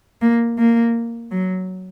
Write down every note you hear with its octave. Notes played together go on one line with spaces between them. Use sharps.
A#3
A#3
F#3